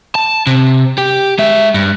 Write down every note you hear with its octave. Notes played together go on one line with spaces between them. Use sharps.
A5
C3
G4
G#3 E5
G2